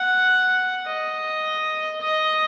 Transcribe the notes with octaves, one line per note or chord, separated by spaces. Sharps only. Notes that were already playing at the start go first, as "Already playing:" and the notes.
Already playing: F#5
D#5
D#5